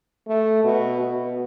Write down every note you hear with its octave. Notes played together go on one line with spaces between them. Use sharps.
A3
B2
B2